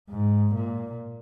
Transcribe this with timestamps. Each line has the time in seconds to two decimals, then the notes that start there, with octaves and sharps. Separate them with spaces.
0.10 G#2
0.54 A#2